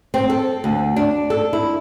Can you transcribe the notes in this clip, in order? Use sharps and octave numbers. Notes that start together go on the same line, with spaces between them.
C4
A4
D2
D4
A4
E4